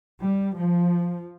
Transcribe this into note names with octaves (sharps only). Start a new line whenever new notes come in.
G3
F3